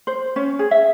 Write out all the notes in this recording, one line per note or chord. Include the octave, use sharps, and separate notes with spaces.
C5
C#4
G#4
E5